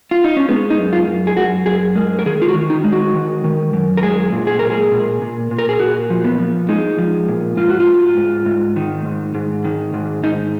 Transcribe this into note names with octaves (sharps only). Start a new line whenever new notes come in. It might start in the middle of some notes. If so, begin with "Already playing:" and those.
F4
D#4
C#4
G#3 B3
D#4
F#2
F4
F#2
G#4
F#2 F#4
F#2 G#4
G#3 A#4
A#4
D#3 G#4
F4
F#4
D#3
D#4
G#3
F#4
D#3
D#3
F#2
A#4
G#3 G#4
A#2
G#4
A#2 A#4
G#4
A#2
A#2
A#2
A#4
G#4
A#2 F#4
F3
B3
F3
G#3 D#4
F3
A#2
G#2 F4
F#4
F4
G#2
G#2
G#2
D#3
G#2
G#2
D#3
G#2
G#2 D#4